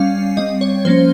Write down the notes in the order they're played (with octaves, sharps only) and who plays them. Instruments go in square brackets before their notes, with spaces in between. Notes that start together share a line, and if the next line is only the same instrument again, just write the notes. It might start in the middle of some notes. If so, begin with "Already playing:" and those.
Already playing: [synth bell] G3 C#4 F5
G3 C4 D#5
C#5
F3 A#3 C#4 C5